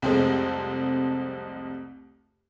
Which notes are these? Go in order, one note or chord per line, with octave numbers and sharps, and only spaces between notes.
C2 F2 G#3 A3 C4